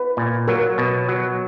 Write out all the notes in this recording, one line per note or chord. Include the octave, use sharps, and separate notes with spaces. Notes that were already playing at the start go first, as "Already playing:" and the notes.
Already playing: B4
A#2
F#3 A#4
B2
F#3